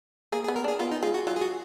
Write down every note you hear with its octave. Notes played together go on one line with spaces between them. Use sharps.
A#3 G#4
G#4
B3
A#4
D4 G#4
B3 F4
D#4
G#3 F4
F#4
F#3 F4
G#4
F#4